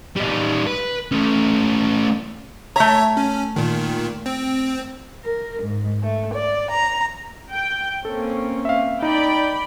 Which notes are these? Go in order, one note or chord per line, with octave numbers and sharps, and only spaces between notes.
G3 D#4
B4
A3 C#4
A3 C#5 E5 A#5
C#4
A#2 D#3
C4
A#4
G#2
A3
D5
A#5
G5
A#3 C4 C#4 A4
E5 F5
D#4 D5 G5 B5